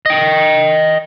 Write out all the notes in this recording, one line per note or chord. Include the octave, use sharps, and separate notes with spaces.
D#5 G5